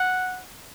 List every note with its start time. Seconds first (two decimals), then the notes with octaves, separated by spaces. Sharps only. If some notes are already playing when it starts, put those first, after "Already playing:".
Already playing: F#5